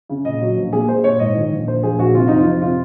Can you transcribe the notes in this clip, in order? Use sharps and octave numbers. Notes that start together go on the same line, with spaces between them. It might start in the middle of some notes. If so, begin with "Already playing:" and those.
C#3
A#2 D#5
F#3
A#1
A#3 G#4
A#3 C5
A#2 C#5
G#2 D#5
D#3
A#1
A#1 C5
A#1 G#4
A#1 F#4
C3 F4
F2 D#4
F4
F2
C3 F4